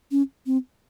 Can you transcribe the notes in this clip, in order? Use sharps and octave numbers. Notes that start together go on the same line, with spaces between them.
C#4
C4